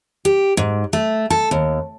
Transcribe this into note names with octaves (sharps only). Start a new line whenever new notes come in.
G4
G#2
A3
A4
D#2